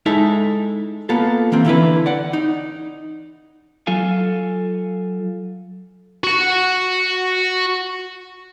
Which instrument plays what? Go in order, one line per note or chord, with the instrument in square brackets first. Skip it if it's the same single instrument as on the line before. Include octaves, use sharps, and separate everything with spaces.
[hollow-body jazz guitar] G#3 D#4 E4 A4 E5
A#3 B3 F4 A4
E3 A#3 C4
D3 E3 E4 B4
D5 F#5
D#4
[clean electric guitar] F#3 F4 A4 F5 G#5
[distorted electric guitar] F#4 F#5